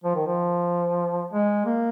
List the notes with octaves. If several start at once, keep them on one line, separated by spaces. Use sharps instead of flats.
F3
D#3
F3
G#3
A#3